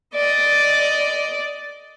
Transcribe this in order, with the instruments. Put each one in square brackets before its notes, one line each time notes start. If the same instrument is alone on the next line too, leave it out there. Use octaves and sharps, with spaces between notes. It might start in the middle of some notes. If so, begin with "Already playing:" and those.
[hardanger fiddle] D5 D#5